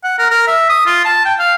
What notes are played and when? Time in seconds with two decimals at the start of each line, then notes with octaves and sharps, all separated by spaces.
0.04 F#5
0.19 A#4
0.30 A#4
0.47 E5
0.69 D#6
0.86 F4
1.05 A5
1.25 G5
1.39 F5